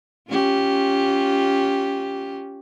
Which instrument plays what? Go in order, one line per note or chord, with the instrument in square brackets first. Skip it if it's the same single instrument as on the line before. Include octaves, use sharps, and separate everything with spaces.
[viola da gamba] C#4 F4 G4